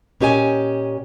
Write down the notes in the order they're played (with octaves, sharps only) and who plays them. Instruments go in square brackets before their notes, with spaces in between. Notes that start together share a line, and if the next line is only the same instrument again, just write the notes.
[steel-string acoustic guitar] A#2 C#4 G4 D#5 G#5